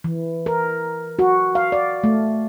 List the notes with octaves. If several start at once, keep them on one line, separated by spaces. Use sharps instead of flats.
E3
A#4
F#4
F5
D5
A3